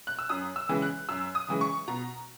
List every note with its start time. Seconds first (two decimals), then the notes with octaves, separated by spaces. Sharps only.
0.07 F#6
0.19 E6
0.29 F#2 D#6
0.56 E6
0.69 C#3 E3 G#3
0.82 F#6
1.09 F#2 E6
1.35 D#6
1.48 C#3 E3 G#3
1.61 C#6
1.88 B2 A#5